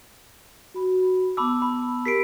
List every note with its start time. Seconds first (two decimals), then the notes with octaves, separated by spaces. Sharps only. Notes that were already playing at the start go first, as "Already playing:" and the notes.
0.74 F#4 B5
1.37 B3 A5 B5 D6 E6
1.62 B5
2.05 G4 A#4 B5 B6 C7 D7